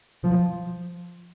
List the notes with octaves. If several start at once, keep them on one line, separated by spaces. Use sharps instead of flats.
F3